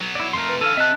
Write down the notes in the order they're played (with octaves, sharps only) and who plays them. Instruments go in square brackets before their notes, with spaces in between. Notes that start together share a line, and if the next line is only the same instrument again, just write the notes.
[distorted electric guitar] F#3 B3
[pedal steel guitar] E4 D5
[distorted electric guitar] F2 A3 [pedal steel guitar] A#4 C6
[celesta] B4
[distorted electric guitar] D3 E3 [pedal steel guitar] A4 [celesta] F5 F6 D#7
[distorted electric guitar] C3 C4 [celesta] D#5 F#6 [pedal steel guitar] E5 A5